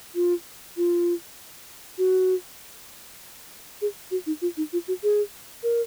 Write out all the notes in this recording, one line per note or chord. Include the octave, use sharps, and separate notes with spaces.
F4
F4
F#4
G#4
F#4
D#4
F4
D#4
F4
F#4
G#4
A#4